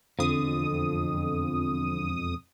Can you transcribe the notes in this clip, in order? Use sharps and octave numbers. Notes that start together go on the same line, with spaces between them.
E1 F2 D3 D#6